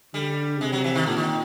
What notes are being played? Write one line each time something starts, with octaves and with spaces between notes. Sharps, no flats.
D3 G3
C3 G#3
F#3
E3
D#3
A#2 D3
D#3